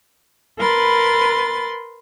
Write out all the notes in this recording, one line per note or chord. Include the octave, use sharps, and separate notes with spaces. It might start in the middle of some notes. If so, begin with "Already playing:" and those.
A#4 B4 B5 C6 A6